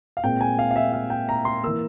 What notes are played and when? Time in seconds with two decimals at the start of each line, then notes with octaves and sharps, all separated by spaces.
0.17 F5
0.24 A#2 G#3 C4 G5
0.41 G#5
0.59 F5
0.71 F5
0.76 E5
0.93 F5
1.10 G5
1.29 A#5
1.45 C6
1.64 E3 A#3 E6